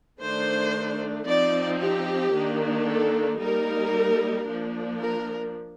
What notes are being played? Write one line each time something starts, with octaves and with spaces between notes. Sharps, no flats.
D#3 A3 D4 C5
F3 C4 D#4 D5
G4
D#3 A#3 D4
A4
G3 A#3 D#4 A#4
F3 A#3 D4
A#4